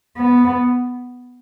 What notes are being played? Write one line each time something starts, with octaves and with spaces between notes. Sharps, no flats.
B3